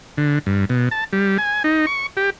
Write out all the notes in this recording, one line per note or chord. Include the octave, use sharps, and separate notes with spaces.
D3
G2
B2
A5
G3
G#5
D#4
C#6
G4